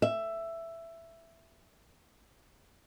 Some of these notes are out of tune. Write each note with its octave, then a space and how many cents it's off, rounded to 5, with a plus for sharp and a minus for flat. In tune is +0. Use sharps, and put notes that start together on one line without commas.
E5 +10